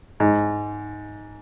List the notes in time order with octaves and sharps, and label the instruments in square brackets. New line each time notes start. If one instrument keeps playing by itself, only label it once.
[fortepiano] G#2